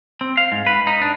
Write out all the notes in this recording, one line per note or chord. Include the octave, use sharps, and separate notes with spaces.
C4
F5
G#2
B4
D#4
D4